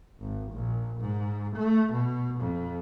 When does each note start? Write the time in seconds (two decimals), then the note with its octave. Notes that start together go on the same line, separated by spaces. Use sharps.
0.21 G#1
0.52 A#1
1.00 G#2
1.56 A3
1.92 B2
2.40 F2